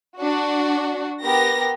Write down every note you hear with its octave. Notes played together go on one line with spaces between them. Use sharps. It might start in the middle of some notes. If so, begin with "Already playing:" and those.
D4 F#4
B3 G4 A#4 A#6